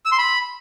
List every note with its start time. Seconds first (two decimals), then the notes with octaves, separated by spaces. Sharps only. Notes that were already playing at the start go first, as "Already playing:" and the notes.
0.05 E6
0.12 C6
0.18 B5